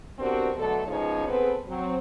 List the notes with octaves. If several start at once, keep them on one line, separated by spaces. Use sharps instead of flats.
B3 C4 D4 F#4 G4 A#4
B2 D3 F#3 A3 A4
C#3 F3 G#3 B3 D#4 C#5
B3 C4 G#4 A4 B4
F#3 C4